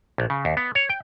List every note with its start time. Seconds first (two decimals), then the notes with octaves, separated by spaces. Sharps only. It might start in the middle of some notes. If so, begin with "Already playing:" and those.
0.18 A#1
0.30 C#3
0.45 D#2
0.57 B3
0.75 C#5
0.89 G5